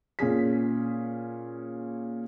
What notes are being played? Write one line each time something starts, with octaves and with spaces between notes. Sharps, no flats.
A#2 C#4 G#4 B6